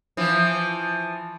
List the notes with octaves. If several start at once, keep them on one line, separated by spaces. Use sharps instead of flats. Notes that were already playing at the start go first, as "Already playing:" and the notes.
E3 F3